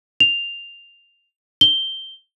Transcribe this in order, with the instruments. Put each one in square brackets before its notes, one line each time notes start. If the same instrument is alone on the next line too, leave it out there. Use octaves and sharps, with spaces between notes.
[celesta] F7
G7